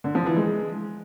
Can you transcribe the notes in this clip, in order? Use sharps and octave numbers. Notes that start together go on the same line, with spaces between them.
D3
F3
E3
G#3